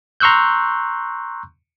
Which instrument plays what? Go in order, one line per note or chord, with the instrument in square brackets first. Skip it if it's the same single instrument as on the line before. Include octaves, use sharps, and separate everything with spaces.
[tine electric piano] A#5 C6 C#6 E6 F#6 G6